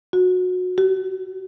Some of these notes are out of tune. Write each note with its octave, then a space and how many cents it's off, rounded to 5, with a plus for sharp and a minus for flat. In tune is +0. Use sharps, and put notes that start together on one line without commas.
F#4 -20
F#4 +45